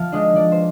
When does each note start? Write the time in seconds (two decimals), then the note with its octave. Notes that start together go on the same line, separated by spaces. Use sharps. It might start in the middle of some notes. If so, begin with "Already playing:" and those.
Already playing: F3 F5
0.12 G#3 D4 D#5
0.35 F3 D5
0.52 C5